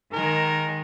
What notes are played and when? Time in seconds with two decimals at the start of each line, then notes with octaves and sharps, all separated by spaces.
0.13 D#3 G#3 A#4